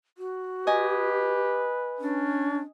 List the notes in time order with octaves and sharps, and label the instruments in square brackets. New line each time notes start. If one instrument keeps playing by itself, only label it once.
[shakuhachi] F#4
[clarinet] G4 [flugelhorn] B4 [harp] D#5 G#5
[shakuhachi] C#4 [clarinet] D4